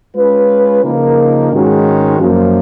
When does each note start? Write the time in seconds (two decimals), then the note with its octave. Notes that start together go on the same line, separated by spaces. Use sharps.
0.16 G#3 C#4 F4 B4
0.84 C#3 F3 A#3 D#4 A#4
1.52 G#2 D#3 G#3 C#4 F#4
2.20 F#2 F3 A#3